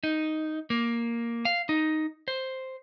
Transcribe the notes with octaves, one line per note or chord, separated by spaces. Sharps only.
D#4
A#3
F5
D#4
C5